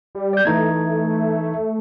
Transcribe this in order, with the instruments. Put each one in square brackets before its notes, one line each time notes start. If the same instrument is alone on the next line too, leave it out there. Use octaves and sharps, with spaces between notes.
[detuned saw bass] G3
[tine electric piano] D5 G6
[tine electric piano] E3 D#4 G#6 [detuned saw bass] A3